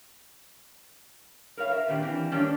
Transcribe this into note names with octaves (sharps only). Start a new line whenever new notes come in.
A#4 B4 C#5 F5
A#4 E5
A#2 D#3 D4 G4
E3 C4
D#3 G3 A#3 C#4 D4